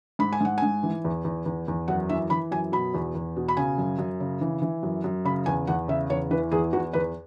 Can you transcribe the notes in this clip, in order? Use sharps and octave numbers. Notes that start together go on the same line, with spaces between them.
G#2 B5
G#5
G#2 F#5
G#2 G#5
E3
E2
E2
E2
E2
F#2 F#5
E3 E5
E3 B5
F#2 G#5
B2 B5
E2
E2
B2
B5
C#3 G#5
F#2
F#2
C#3
E3
E3
F#2
F#2
C#3 B5
E2 G#5
E2 F#5
C#3 E5
E2 C#5
E3 B4
E2 G#4
E2 F#4
E2 B4